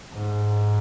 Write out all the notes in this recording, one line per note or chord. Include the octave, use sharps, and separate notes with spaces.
G#2